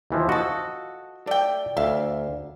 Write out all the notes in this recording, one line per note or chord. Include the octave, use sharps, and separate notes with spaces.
D#2 E3 F3
F3 F#4 A4 D#5
A3 D5 G5
D2 E5 F5